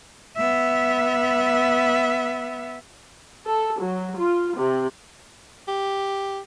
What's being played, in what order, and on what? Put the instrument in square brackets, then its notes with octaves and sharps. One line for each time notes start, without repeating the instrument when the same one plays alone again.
[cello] B3 E5
[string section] A4
F#3
F4
C3
[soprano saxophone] G4